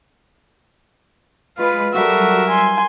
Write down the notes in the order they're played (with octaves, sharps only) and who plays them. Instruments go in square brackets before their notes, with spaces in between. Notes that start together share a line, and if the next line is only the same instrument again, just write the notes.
[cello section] G#3 B4 [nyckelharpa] F4
[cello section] F#3 G3 [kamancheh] F#4 A4 [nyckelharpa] A#4 E5
[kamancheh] G#5 C6